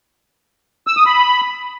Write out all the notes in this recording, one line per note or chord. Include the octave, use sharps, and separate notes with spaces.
E6
D#6
B5